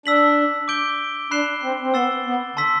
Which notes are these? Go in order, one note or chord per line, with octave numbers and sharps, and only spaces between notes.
D4 E6 B6 F#7
D6 G6 D7 G7
D4 B5 F#6 C7 E7 G7
C4
C4
B3 E6 A6 C7 E7 G7
B3
D3 A5 C6 E6 B6